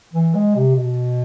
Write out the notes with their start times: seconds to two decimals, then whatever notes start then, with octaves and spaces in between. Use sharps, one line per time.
0.13 E3
0.35 G#3
0.55 C3
0.76 B2